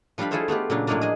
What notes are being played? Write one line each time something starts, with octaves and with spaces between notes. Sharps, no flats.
F3 G3 D4 G4 F5 B5
E4 F4 G#4 A4 C5 C#5
A3 B3 F4 G4
A#2 C#3 F#3 D4
A2 F3 F#3 G#3 A#3 D4
G#4 D#5 G#5